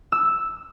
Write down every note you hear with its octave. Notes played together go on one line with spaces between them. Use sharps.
E6